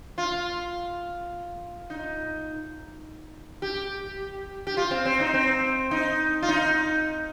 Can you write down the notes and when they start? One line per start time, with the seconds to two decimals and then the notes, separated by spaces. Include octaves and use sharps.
0.18 F4
1.90 D#4
3.62 G4
4.67 G4
4.77 F4
4.91 C4
5.05 C4
5.20 D#4
5.34 C4
5.91 D#4
6.42 F4
6.49 D#4